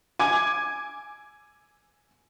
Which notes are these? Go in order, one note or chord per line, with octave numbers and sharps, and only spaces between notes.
G#5 D6 G#6